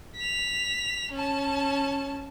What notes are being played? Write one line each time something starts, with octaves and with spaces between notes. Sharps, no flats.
B6 F7
C#4 A5